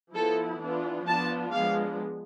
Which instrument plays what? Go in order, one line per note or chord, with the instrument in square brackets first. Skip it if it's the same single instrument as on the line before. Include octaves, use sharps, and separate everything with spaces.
[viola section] F3 B3 E4 A4
E3 B3 D4 F4
F3 B3 D4 F4 A5
F3 G#3 B3 D4 F5